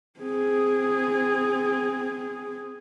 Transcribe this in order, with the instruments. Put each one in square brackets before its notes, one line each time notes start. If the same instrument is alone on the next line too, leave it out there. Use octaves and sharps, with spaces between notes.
[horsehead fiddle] C4 G#4